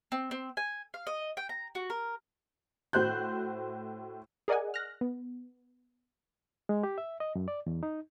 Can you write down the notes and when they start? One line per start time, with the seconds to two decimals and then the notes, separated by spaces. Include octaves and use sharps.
0.12 C4
0.31 C4
0.57 G#5
0.94 F5
1.07 D#5
1.37 G5
1.49 A#5
1.75 F#4
1.90 A#4
2.93 A2 F#4 C5 F#6 G6
4.48 G#4 A#4 D5 D#5 F#5 G#5
4.74 F6 F#6 A#6
5.01 B3
6.69 G#3
6.83 G4
6.98 E5
7.20 D#5
7.35 F#2
7.48 D5
7.66 E2
7.83 D#4